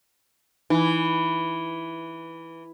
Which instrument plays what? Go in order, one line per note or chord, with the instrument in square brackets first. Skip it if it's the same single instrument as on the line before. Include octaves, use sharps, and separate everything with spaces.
[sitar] E3 [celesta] D#4 E4 G#5